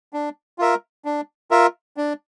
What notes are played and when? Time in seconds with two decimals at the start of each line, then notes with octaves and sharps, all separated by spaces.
0.13 D4
0.58 F4 A#4 E5
1.05 D4
1.51 F4 A#4 E5
1.97 D4